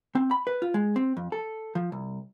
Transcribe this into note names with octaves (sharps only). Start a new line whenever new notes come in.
C4
B5
B4
F4
G#3
C4
F2
A4
F3
C2